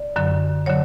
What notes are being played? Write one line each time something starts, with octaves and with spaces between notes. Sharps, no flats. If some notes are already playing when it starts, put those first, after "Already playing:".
Already playing: D5
F#2 D3 F#3
D3 F#3 C#5